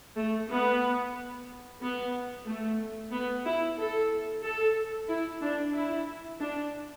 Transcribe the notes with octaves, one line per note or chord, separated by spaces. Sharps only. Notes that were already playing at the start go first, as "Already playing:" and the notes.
A3
B3
B3
A3
B3
E4
A4
A4
E4
D4
E4
D4